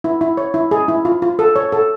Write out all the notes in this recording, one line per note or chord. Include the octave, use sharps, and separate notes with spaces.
E4
E4
C#5
E4
G#4
E4
F4
F4
A4
C#5
A4